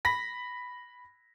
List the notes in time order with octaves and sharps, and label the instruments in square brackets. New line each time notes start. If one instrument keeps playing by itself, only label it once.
[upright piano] B5 A#6 B6